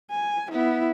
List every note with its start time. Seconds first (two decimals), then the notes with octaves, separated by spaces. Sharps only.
0.11 G#5
0.51 B3 E4